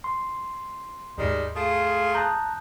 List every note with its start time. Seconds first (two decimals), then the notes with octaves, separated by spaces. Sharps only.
0.04 C6
1.18 D#2 G#2 D#3 G3 G#3
1.56 A3 F4 G#4
2.15 A5 A#5 D#6 F#6 G6